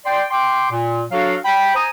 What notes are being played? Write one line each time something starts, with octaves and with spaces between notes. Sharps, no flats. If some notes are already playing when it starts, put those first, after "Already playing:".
D5 G5 C6
G5 C6 D6
A#2
F#3 D4 F#4 A4 F5
G5 B5
C5 G#5 A#5 D#6